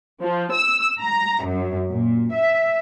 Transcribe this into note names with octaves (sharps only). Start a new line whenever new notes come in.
F3
E6
A#5
F#2
A#2
E5